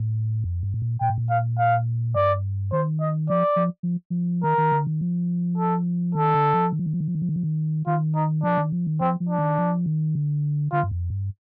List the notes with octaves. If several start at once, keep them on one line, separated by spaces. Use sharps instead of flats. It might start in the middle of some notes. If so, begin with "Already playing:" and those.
Already playing: A2
F2
G2
A2
A#2
A#2 G5
A2
A#2
F5
F5
G2 D5
D#3 C5
D#5
F3 D5
F3
F3
F3
D#3 A#4
D#3
D3
D#3
F3
A4
D#3 A4
D3
F3
D#3
F3
D#3
F3
D#3
F3
D#3
F3
D#3
F3
D#3
D#3 F4
D#4
F3 D4
D#3
F3
D#3
F3 C4
F3
D4
D#3
F3
D#3
D3
D3 F4
G2
F2
G2